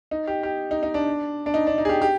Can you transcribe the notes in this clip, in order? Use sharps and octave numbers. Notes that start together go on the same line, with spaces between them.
D#4
G4
G4
D#4
D#4
D4
D4
D#4
D4
D#4
G#4
G4
G4